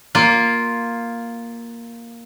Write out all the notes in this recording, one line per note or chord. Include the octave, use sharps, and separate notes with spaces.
A#3 F4